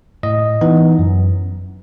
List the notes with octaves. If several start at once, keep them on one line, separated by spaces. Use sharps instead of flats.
A2 D#5
E3 B3 D#4
F#2